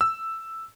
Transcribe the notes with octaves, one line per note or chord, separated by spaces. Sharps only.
E6